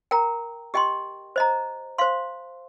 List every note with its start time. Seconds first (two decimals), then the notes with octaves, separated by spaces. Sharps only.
0.11 A#4 G5 A#5
0.74 G4 D#5 G5 C6
1.36 C5 D#5 A#5
1.98 C5 F5 C6